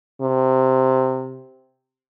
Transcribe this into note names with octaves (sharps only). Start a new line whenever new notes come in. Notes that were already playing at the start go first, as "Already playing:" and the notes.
C3